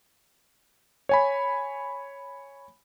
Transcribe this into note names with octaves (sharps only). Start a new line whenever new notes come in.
C#5 G#5 B5